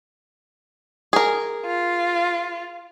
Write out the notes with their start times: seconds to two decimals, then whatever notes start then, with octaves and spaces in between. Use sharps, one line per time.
1.13 G#4 A#4
1.67 F4